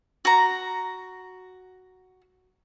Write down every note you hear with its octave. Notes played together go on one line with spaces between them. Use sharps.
F#4 A#5